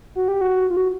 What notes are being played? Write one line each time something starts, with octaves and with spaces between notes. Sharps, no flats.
F#4
G4
F#4
F4
F#4